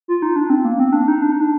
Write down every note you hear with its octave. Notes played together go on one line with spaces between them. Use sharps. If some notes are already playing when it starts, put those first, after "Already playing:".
F4
D#4
D4
C4
A#3
C4
D4
D#4
D4
D#4
D4